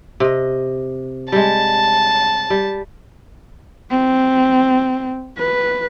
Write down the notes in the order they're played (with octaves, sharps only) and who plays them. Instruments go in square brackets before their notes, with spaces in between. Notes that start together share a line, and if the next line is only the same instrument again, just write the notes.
[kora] C3 D#5
[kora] G3 G#3 [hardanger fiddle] A5
[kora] G3
[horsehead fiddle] C4
B4